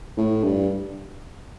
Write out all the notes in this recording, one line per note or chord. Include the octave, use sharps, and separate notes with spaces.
A2
G2